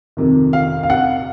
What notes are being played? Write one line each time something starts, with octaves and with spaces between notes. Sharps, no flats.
F2 C3 D#3
F5
F5
F#5